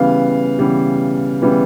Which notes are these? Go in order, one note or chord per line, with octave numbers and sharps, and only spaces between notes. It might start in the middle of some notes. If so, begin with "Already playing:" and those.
Already playing: C#3 E3 G3 B3 F5
C#3 E3 G3 B3
C#3 E3 G3 B3